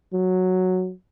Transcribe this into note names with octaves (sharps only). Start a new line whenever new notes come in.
F#3